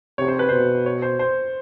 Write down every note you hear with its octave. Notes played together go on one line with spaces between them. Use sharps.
C3 C#5
C5
B4
B2 C5
C#5
C5
C5